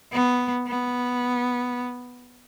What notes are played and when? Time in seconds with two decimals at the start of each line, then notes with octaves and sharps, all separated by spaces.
0.12 B3
0.67 B3